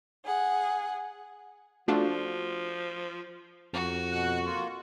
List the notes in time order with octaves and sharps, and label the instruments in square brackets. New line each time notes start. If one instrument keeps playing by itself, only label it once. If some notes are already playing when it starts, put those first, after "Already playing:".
[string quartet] G#4 F#5
[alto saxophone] F3 [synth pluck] A3 D4 F4 [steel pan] F#4
[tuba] F2 [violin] F#4
[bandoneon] B2 F#5 F#6
A#3 F4